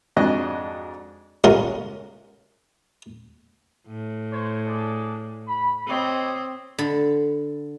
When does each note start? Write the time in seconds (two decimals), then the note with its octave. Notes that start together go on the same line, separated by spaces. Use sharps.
0.16 F2 G#2 D4 F#4 D#5 F#6
1.44 C#2 G2 C#4 F4 A#4 F#5
3.87 A2
4.31 C5 C#5
4.65 D4 G#4 D5
5.47 B5
5.88 C4 G4 C#5 D#5
6.78 D3 B5